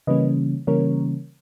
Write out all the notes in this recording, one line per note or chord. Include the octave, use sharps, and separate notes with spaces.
C#3 E3 G3 A#3 C#4 B4 D#5
C#3 E3 G3 A#3 C#4 A#4 C#5